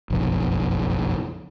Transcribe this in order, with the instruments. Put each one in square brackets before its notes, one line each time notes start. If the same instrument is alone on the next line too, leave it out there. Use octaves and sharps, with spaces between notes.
[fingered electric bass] F#1 B1 F2